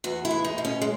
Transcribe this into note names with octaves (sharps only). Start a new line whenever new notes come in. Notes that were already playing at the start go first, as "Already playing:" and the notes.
E2 F#4
E4
G#3
D#4
B2
C#4
G#3